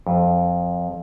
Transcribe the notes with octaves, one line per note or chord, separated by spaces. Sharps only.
F2